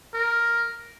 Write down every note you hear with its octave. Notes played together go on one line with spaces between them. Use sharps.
A#4